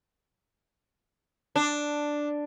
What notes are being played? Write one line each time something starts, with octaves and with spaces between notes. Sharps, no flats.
D4